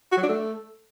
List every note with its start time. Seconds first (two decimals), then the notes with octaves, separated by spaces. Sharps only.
0.12 F#4
0.17 F#3
0.23 D4
0.28 A3